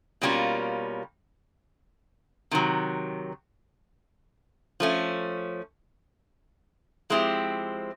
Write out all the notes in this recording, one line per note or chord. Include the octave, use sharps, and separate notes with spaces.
B2 G3 A#3 C#4 F4
C3 D#3 F#3
F3 A3 C#4
F3 G#3 C4 E4 G4